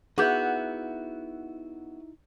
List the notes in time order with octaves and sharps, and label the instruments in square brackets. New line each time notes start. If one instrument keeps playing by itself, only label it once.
[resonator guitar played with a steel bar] B3 F#4 [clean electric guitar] D#4 E4 E5 [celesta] G#4 D6 G6